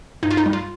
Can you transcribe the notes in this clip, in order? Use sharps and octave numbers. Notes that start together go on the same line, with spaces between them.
G2 D#4
F4
D#4
G3
F4